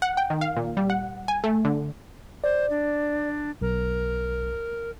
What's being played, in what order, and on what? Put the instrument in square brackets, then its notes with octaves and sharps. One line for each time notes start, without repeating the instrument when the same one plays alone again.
[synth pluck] F#5
G5
D#3
F5
A#2
G3
F#5
G#5
A3
D3
[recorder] C5 [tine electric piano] D5
[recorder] D4
[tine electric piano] B1 [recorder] A#4